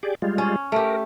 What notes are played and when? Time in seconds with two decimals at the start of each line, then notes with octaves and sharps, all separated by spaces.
0.03 G4 G#4 D5
0.22 G3 G#3 F4
0.38 C#4
0.72 A3 G4 A#4